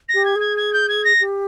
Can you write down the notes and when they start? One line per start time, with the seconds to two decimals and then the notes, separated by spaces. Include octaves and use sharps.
0.08 A#6
0.14 G4
0.25 G#6
0.36 G#4 G#6
0.57 G#6
0.73 G6
0.89 G#6
1.04 A#6
1.21 G4